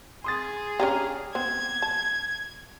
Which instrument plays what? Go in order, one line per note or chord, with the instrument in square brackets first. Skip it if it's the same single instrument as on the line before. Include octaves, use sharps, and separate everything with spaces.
[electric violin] G#4 [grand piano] C6 D#6 A6
[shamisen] C#4 D4 G4 [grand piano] A#5 D6 F6
[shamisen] B3 C4 [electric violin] G#6
[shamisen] A5